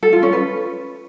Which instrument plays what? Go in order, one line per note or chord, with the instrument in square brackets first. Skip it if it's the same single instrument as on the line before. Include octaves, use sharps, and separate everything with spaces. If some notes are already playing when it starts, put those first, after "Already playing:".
[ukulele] A4
F4
C#4
B4